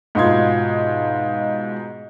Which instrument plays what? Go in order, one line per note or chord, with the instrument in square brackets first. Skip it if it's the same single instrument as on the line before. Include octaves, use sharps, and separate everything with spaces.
[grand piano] G#2 B2 F4 C6 G#6